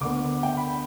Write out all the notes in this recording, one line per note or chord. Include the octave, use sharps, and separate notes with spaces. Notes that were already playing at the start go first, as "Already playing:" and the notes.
D2 D3 B3 D6
G5
B5